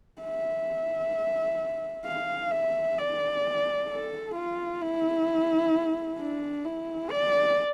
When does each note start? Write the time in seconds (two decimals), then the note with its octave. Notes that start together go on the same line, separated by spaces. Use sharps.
0.22 E5
2.06 F5
2.51 E5
2.98 D5
3.89 A4
4.35 F4
4.81 E4
6.19 D4
6.65 E4
7.10 D5